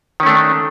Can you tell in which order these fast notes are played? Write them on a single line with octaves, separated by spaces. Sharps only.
D#3 C#4 A3 D4